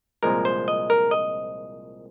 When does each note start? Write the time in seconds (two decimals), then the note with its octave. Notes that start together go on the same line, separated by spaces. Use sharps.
0.23 C2 A#2 F3 G#3 A#4
0.45 C5
0.68 D#5
0.90 A#4
1.11 D#5